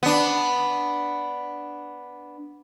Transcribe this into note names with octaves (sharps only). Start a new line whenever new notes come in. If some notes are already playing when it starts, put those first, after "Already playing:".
B3 D4